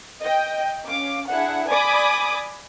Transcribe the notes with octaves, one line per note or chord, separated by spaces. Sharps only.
D#5 G5
C#4 F5 D6
D4 E4 G#4 F#5
D5 G#5 B5 D6 D#6